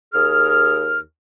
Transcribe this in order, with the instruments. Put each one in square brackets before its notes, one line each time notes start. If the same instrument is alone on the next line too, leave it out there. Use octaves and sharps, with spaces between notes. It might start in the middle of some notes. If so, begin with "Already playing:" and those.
[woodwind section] D#2 G#4 F6